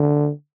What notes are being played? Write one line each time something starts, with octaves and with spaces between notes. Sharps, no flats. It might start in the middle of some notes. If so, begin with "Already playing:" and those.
Already playing: D3